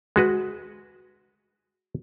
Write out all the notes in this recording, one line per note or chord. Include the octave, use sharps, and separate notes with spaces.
G#3 F#4 B4